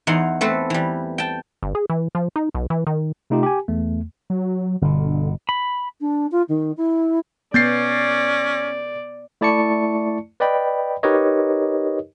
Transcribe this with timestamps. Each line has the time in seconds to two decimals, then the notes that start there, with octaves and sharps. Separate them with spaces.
0.07 E2 E3 D#4 F#5 C6
0.41 A3 C4 A4 B4
0.70 E3 G3
1.18 G5 A5
1.63 G1
1.75 G#4
1.90 E3
2.15 F3
2.36 D#4
2.55 B1
2.70 E3
2.87 D#3
3.30 C3 A3 D#4 F4 G4
3.43 G4 G#5
3.68 E2 A3
4.30 F#3
4.82 G1 B2 D3
5.49 B5
6.00 D4
6.31 F4
6.48 D#3
6.76 E4
7.54 B3 C#4 D5 G6 A6 C7
9.41 A3 E4 D5 A5 C#6 C#7
10.40 B4 D5 D#5 G5 B5
11.03 D#4 G4 A#4 B4 C#5 D#5